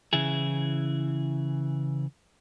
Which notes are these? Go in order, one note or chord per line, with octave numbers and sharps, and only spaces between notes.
C#3 E3 E4 G#4